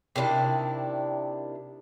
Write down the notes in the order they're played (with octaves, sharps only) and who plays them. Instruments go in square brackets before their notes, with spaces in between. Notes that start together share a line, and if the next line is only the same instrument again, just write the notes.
[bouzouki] C3 D#3 D4 E4